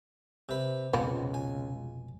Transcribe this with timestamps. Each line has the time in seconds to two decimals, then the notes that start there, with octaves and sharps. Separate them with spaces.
0.49 C3 B4
0.93 F1 C#2 B2 F3 G#3 B3 C4 G#5
1.34 G#5